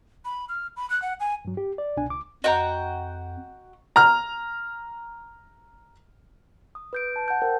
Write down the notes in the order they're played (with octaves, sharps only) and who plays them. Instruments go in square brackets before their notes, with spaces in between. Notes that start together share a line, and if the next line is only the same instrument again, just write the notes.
[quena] B5
F6
B5
F#6
F#5
G#5
[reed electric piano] G2 F#3
G4
D5
C2 B2 D4 G#5
C#2 D6
[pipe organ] F2 [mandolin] F#4 F#5 G5 [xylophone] D#5 A#5
[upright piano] A#5 F6
[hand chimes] D#6
B4 G6 D7
A5
F#5 A5 G6
A#4 C5 F#5 G5